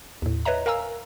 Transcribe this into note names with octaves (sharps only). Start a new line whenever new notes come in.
D#2 A2
B4 C#5 D#5 E5 A#5
A#4 F5 G#5 A#5 E6